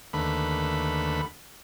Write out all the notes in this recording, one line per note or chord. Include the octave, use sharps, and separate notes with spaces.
D#2 D3 A3 B4 B5